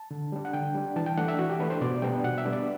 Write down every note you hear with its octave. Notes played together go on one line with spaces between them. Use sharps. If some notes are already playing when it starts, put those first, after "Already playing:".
Already playing: A5
D3
G3 D4
F#5
D3 G5
G3 D4
E3 A5
G5
A3 D4 F#5
E5
E3 F#4
G4
A3 D4 B4
C5
B2 D5
G3 B3 D4 G5
B2 F#5
E5
G3 B3 D4
D5